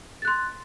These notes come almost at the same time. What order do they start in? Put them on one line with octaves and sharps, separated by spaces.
A6 F#6 C6